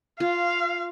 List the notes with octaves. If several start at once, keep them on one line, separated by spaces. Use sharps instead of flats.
F4 F5